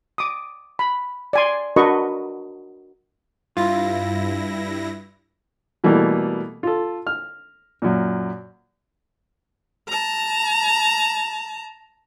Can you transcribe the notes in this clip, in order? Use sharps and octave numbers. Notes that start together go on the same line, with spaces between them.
D6 D#6
B5
D5 G#5 C6
D4 F#4 A#4 B4 D#5 C#6
G2 E4 F4 A#6
B2 E3 G3 A3 A#3
F4 A4
F6
F#2 A#2
A5 A#5